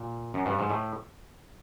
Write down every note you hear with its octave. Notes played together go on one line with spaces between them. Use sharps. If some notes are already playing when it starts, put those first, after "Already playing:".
Already playing: A#2
F#2
G2
G#2
A2